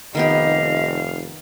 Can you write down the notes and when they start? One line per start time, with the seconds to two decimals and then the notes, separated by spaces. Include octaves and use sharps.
0.15 F1 D#3 B3 G4 D#5 F5